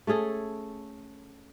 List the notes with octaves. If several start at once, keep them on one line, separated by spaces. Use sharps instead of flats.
A3 C#4 G#4 A4